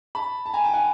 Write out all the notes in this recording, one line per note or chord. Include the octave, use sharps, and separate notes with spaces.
A5 B5
A5
G#5 A#5
G5 A5
F#5 G#5